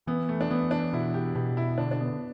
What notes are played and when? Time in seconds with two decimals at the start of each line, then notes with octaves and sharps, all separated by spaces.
0.07 E3 B3
0.29 A3
0.41 D4
0.51 E3 B3
0.71 D4
0.93 B2 E4
1.14 G4
1.35 B2 G4
1.57 E4
1.78 D3 D4
1.91 D4
2.00 B3